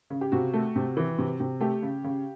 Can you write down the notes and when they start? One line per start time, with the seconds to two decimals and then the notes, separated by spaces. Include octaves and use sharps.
0.10 C#3
0.21 G4
0.32 C3 F#4
0.54 A3
0.76 C3
0.97 E3
1.18 C3
1.40 C3
1.61 A3 G4
1.82 C#3
2.04 C#3